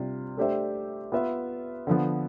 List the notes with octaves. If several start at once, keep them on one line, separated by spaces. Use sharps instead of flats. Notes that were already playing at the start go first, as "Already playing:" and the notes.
Already playing: C3 G3 D4 F4
A3 D4 G4 C5 E5
B3 F4 B4 E5
D3 F3 B3